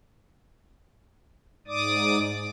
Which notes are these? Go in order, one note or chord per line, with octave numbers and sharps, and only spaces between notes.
G#2 D5 D6 D#6